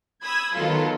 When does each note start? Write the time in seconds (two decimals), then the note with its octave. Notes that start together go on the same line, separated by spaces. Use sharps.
0.24 B5 D#6 E6 G#6
0.55 D#3 F#3 B3 F4 A4